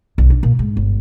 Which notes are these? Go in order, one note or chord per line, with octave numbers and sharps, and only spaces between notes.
B1
D4
A#2
G#2
G1